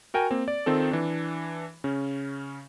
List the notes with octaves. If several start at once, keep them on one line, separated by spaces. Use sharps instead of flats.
F#4 A#4 G5 G#5
A#3 C4
D5
D#3 C4 F4 A4
E3 D4
C#3 C#4